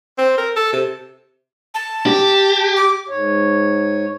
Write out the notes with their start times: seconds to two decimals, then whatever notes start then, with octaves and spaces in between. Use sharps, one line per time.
0.18 C4
0.38 A#4
0.56 A4
0.73 C3
1.74 A5
2.06 G4
2.76 D6
3.09 G#2 C#5